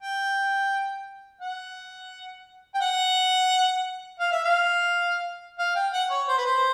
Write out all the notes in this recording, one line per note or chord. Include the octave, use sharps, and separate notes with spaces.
G5
F#5
G5
F#5
F5
E5
F5
F5
G5
F#5
C#5
C5
B4
C5